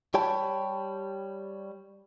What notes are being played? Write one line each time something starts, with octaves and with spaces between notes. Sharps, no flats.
G3 G4 C#5 G5 A5 B5